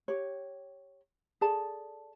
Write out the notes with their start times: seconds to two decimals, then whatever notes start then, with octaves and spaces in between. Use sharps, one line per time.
0.08 G4 C#5
1.41 G#4 A4 D5 A5